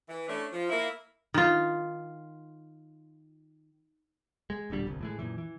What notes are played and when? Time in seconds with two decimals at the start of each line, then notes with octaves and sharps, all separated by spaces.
0.09 E3
0.26 A3 C#4 D4 E4
0.52 F3
0.70 A#3 E4
1.34 D#3 F4
4.50 G#3
4.70 E1 A#1 D3 G3
4.87 G1 C2
5.01 A2 E3 G#3
5.19 F#2 A#2 E3
5.38 E3